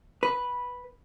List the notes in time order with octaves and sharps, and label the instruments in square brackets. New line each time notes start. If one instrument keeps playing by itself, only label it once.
[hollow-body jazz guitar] B4